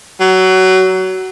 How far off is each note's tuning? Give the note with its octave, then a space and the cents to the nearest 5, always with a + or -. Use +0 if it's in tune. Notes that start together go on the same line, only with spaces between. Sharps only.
F#3 +20